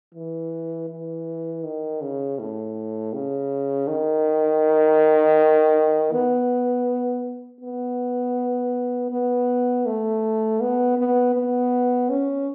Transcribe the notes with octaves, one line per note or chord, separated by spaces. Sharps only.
E3
E3
D#3
C#3
A2
C#3
D#3
B3
B3
B3
A3
B3
B3
B3
C#4